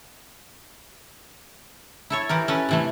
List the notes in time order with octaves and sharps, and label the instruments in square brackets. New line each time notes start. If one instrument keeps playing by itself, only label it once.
[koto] E4 A4 C#5
E3 G4 A#4
C#4 A4 B4
C3 E3 A3